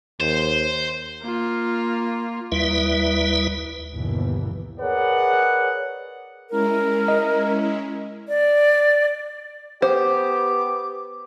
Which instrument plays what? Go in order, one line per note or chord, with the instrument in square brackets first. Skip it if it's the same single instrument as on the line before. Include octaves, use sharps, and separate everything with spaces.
[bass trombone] D#2 [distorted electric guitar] C5
[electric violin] A#3 F4
[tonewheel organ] D#2 G3 E4 B4 E5
[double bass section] G1 D#2 B2 E3
[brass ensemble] G#4 A#4 B4 C#5 D5 F#5
[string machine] G#3 C#4 E4 [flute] A#4
[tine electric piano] D#5
[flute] D5
[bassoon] B3 [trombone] G4 [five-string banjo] C5 [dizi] D6